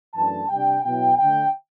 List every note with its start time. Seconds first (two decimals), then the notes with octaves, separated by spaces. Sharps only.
0.14 F#2 E3 A3 D4 A5
0.49 C3 G3 D4 G5
0.83 B2 F#3 B3 E4 G5
1.18 D3 A3 D4 G5